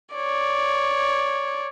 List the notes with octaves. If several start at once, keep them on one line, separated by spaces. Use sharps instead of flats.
C#5 D5